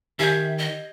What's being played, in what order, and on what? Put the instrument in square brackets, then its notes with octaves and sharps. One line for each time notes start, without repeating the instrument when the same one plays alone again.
[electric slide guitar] D#3 [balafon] G4 G#5 [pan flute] E5 [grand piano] G6 G#6 C7
[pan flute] D#5